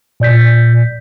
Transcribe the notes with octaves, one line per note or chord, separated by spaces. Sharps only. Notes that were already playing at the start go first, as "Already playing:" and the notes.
A#2 D5 G6 B6